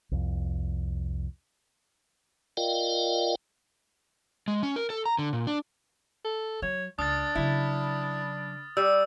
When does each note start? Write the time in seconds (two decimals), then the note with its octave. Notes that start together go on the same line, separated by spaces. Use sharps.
0.11 C2 F2
2.57 F4 A#4 D5 D#5 F5 G5
4.48 G#3
4.63 C#4
4.76 A#4
4.90 A4
5.06 A#5
5.18 D3
5.33 A#2
5.47 D4
6.24 A4
6.62 F#3 C#5
6.99 C#2 D4 D#6 F6 A6
7.35 C#3 F#3 E4
8.77 G3 E6